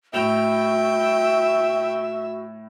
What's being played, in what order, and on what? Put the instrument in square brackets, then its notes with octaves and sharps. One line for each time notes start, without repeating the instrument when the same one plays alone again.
[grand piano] A2 E7 F7 [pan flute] F#4 [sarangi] E5 [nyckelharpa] G5